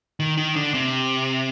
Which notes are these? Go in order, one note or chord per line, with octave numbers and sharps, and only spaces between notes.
D#3
D#3
D3
C3